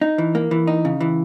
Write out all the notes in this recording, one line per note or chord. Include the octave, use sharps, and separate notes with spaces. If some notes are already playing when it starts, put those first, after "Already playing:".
D#4
E3
A#3
E3
D#4
C#3
E3